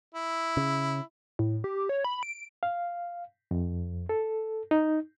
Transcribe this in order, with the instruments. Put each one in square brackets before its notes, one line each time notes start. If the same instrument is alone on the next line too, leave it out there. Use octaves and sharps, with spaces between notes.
[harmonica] E4
[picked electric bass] C#3
[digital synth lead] A2
G4
C#5
B5
D7
[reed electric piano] F5
F2
A4
D#4